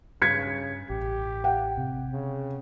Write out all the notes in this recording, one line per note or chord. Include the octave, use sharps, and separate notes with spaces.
G2 C#3 G#6 B6 C#7
A1 G4
F#5 G5
C3
C#3